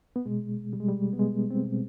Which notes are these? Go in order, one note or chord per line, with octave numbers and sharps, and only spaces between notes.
B3
B2 G#3
B2 G3
G#3
G3
B3
B2 G#3
C4
B2